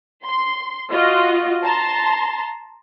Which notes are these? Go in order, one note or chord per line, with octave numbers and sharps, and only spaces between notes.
C6
F4 F#4 D#5
A5 A#5 C6